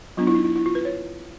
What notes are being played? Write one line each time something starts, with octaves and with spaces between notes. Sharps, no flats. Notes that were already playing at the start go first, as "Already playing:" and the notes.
F#3 B3 D4 F4
E4
D#4
E4
E4
F4
B4
C#5